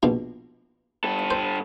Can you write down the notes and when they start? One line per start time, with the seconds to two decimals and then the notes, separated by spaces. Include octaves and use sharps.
0.03 A#1 B2 F5
1.04 G2 A4
1.31 C5